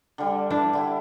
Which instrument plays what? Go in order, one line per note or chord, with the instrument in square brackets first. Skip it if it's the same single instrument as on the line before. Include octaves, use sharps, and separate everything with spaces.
[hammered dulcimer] D3 G3
[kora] D4 [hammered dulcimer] E4
[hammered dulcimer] D3 E4 G4